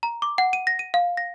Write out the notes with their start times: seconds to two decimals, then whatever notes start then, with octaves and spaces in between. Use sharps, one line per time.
0.03 A#5
0.22 D6
0.38 F#5
0.53 D#7
0.67 A#6
0.79 D#7
0.94 F5
1.17 A#6